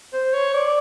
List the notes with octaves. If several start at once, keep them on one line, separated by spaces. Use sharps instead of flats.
C5
C#5
D5